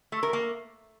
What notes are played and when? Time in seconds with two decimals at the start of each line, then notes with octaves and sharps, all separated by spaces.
0.12 A3
0.23 A#4
0.33 A#3